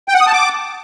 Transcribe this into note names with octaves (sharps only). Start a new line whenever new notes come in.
G5
F#5
D#6
A5
D6